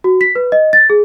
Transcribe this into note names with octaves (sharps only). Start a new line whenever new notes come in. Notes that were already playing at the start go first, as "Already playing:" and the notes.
F#4
B6
B4
D#5
A6
G#4